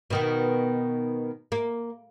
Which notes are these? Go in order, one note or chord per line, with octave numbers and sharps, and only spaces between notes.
B2 D#3 B3
A#3